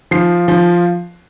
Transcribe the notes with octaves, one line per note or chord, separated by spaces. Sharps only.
F3 C7
F3